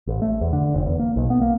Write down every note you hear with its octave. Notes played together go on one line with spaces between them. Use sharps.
A1
A3
E2
D3
F1
E2
A#3
B1
B3
A#3